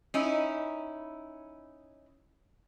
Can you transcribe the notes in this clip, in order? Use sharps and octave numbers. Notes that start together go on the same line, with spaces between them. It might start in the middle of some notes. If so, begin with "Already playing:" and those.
C#4 D#4 E4